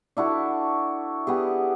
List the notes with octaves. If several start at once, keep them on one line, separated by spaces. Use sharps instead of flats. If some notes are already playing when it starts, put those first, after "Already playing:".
D4 E4 F#4 A4
B3 G4 G#4